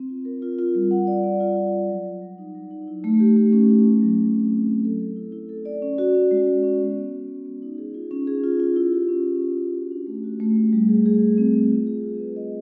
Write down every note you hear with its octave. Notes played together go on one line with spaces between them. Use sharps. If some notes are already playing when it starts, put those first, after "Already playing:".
Already playing: C4
F4
A#4
F4
F4
G3
F#5
D5
D5
F4
F4
F#5
F#3
F#3
F#3
D#4
F#3
D#4
E4
A3
G4
A3
C#4
E4
A3
F#3
F#3
C4
C4
C4
A4
A4
E4
E4
A4
D5
C#4
F#4
C#4
G#3
C#4
C#4
B3
B3
F#4
B3
B3
D#4
G#4
F4
C#4
G#4
F4
F4
E4
G4
C#4
E4
G4
C#4
F#4
D4
A3
F#4
A3
A3
G3
G#4
G#4
G3
C4
G#4
F4
G#4
F4
B4
D#5